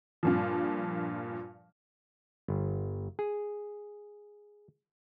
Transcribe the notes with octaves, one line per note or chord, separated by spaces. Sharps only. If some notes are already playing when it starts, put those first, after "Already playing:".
G2 A#2 F3
G1
G#4